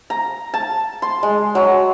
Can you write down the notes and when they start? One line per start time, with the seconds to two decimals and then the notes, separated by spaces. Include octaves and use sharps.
0.10 A#5
0.54 A5
1.02 C6
1.23 G#3
1.55 F#3